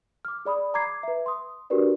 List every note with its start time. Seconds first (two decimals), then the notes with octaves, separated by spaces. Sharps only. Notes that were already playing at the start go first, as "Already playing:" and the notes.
0.25 D6 F6
0.45 G#4 D5 B5 D#6
0.74 A#5 D6 G#6 C7
1.03 B4 E5
1.26 C6 D#6
1.70 D4 F#4 G4 A#4 B4 D5